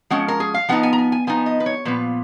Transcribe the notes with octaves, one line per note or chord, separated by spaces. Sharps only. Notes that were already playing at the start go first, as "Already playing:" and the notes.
F3 G#3 C#4 F#5
A#4
G#4
F5
F3 B3 D#4 F#5
G#5
A#5
G#5
G#5
F3 B3 D#4 G#5
D#5
B4
C#5
A#2 F3 B3 B4